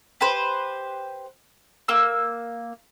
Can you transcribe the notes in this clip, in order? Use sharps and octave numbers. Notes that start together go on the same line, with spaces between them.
G4 B4 C5
A#3 E6